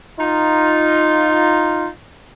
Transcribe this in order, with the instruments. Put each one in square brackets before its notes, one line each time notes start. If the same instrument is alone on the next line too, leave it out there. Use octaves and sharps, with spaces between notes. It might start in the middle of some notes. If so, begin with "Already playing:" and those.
[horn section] D#4 F4